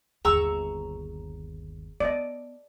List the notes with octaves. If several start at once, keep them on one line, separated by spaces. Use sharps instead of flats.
G1 D#2 G#4 A#5 C#6 E6
B3 D5 D#5